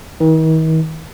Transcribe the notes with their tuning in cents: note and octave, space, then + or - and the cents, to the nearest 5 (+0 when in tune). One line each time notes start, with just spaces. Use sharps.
D#3 +45